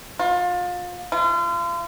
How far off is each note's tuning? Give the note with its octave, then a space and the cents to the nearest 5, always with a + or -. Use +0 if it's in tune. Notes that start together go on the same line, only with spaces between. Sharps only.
F4 +30
F4 -40